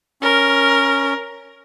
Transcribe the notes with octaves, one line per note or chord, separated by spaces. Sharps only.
C#4 A#4